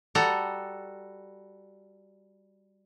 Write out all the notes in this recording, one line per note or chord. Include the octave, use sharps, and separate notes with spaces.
G3 F#4 A4 A#5